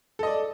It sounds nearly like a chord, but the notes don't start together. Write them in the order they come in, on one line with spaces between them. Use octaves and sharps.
A4 D#5 D5